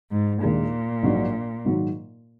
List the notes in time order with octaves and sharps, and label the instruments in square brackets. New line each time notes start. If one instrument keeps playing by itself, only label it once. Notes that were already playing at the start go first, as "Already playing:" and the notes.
[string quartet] G#2
[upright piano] D#2 D#3 G#3 D4 [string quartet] A#2
[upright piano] A#1 G#2 F#3 D4
G#2 D#3 F#3